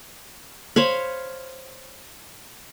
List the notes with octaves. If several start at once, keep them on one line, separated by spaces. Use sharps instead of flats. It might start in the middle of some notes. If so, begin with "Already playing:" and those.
C5 C#5 F5 B5